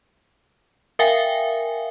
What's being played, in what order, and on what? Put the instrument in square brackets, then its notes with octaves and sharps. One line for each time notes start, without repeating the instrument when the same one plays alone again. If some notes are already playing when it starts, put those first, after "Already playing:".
[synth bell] A#4 E5 F5 G5 G#5